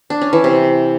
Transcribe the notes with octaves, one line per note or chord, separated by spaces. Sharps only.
D4
C#4
E3
C3